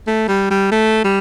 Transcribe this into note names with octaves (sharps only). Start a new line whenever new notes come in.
A3
G3
G3
A3
G3